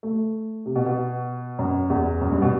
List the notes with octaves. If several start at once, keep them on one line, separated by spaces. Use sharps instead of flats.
A3
C3
B2
B2
F#2
E2
F#2
G2
B2